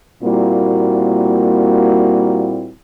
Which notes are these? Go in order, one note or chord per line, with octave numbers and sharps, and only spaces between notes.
A#2 G3 A#3 C4 E4 F#4